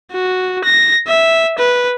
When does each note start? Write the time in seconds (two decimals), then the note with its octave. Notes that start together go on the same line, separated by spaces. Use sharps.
0.12 F#4
0.64 A#6
1.07 E5
1.58 B4